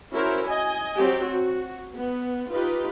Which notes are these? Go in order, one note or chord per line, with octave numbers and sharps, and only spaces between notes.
C#4 E4 F#4 A#4 C5
D#5 G#5
F#3 C4 G4
F#4
B3
D#4 F4 G4 B4